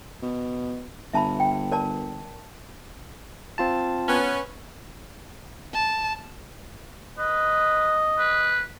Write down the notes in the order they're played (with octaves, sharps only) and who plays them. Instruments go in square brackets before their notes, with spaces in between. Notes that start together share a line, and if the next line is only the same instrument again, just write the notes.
[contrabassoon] B2
[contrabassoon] G1 [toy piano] E5 A5 B5
[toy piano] G5
A#4 D5 A5
[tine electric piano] C4 F4 A5
[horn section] B3 C#4
[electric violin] A5
[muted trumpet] B4 [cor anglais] D#5
[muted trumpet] B4